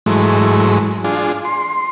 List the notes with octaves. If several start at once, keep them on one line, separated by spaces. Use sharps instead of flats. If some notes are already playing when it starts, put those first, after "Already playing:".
G#2 E3 F#3 G#3 A3
D4 F4 G#4
C6